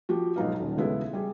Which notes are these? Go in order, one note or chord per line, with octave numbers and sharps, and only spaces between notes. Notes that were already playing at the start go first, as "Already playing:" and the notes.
F3 F#4 G4
B1 G#2 F3 D#4 B4 F5
D#1
C#3 E3 G#3 B3 E4 A4
G3 G#4